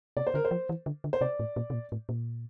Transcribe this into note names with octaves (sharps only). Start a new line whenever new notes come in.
C3 D5
C5
D3 A#4
C5
F3
E3
D3
D3
C5
C3 D5
A2
A#2
C3
A#2
A2
A#2